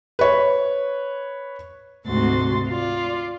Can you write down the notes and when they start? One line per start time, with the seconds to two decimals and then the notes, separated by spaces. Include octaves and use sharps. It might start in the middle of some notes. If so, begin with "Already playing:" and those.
0.19 B4 C#5
2.06 D2 G#2 C3 F#4 C6 A6
2.69 F4 D5